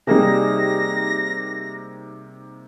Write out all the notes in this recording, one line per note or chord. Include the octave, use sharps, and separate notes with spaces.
C3 G3 A#3 D#4 G4 G#4 A#6